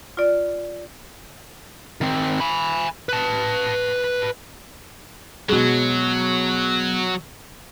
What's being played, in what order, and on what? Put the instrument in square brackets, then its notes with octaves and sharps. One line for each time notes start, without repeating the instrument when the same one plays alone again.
[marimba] F4 D5
[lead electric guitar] D#3 C4
G#5 B5
B4 A5
[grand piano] B2 G#3 [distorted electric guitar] F#3